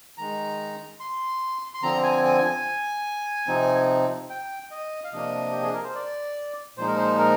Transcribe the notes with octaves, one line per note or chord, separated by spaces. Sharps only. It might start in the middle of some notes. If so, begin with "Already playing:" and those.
D#3 G#3 D#4 A#5
C6
C6
D3 F3 C4 A#5
G#5
G#5
G#5
C3 F3 C4 D#4
G5
D#5
F5
C3 F3 A#3 D4 D#5
G4
G#4
A#4
C5
D5
A#2 F3 G#3 D#4 C5
A#4
C5
A#4